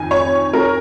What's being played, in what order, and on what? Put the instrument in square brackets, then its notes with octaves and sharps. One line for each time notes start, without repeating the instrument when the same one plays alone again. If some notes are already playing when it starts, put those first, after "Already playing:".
Already playing: [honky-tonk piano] F2 D#3 G#5
C#5
A#4